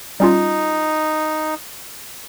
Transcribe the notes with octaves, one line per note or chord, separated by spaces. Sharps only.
G3 C#4 D#4 F4